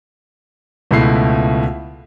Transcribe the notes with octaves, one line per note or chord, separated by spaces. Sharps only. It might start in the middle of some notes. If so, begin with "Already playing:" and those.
C#2 B2 A3 E4 C7